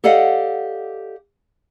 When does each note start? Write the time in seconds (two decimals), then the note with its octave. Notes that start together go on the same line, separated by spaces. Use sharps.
0.04 G4 A4 D5 D#5 F5 F#5